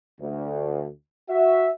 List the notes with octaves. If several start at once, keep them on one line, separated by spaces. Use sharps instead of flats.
D2
F#4 E5